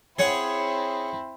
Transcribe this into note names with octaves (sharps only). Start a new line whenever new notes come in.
C4 E4 G#4 C#5 F#5